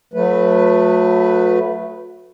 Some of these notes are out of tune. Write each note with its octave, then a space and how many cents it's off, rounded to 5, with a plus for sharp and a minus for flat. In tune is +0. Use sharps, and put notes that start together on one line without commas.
F#3 -35 A3 +0 B4 -5